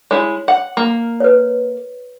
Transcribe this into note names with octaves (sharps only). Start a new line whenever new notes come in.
G#3 E4 C#5
F#5
A#3
B4 C#5